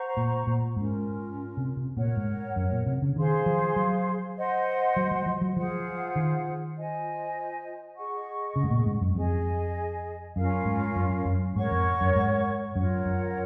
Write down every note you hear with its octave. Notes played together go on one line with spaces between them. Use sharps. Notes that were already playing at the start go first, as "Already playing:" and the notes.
Already playing: C5 F#5 A#5 C#6
A#2
A#2
G#2 C#4 F4 A#4
C3
C3
A#2 A#4 C#5 F#5
G#2
F#2
A#2
C3
C#3
D#3 G#4 C5 F5 C6
F3
F#3
C5 D#5 F#5 C6
F#3
F#3
F3
F#3
F3 F4 G#4 C5 F#5
D#3
F4 C5 D#5 G#5
G#4 D#5 F#5 C#6
C#3
G#2
A#2
G#2
F#2
F2 G#4 D#5 G#5
F#2 C#4 F4 A#4 F5
G#2
F#2
F#2
G#2 A#4 C#5 F#5 C#6
F2
F#2
G#2
F#2 F4 A#4 C#5 F#5
F#2